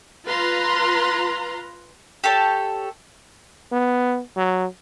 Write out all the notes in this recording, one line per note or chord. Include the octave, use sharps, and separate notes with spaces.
F4 B4 A#5 C6
G4 A4 C#5 A5
B3
F#3